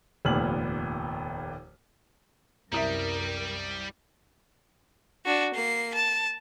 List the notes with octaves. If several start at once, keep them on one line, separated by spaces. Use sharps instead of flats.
F1 D#2 A#2 B3 F6 F#7
C2 F#2 G3 A#4 E5 A#5 D#6 B6
D4 F#4
A#3 C7
A5